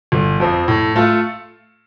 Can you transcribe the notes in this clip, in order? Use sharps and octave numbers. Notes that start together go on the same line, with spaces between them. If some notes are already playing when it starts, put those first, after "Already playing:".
G1
F2 F3 C4
A2
A3 F4 A4